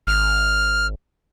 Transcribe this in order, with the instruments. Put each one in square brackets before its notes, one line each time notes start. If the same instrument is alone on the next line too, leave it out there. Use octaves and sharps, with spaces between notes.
[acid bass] G#1 [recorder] F6